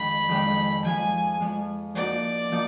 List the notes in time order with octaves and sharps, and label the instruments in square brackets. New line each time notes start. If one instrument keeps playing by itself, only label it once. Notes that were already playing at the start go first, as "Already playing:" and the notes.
Already playing: [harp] F2 D#3 G#3 D4 [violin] B5
[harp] F2 D#3 G#3 D4
[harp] F2 F3 G#3 [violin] G#5
[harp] F2 F3 G#3
[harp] F3 A#3 D#4 F#4 [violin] D5
[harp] F3 A#3 D#4